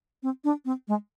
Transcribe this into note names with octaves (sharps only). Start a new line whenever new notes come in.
C4
D4
C4
G#3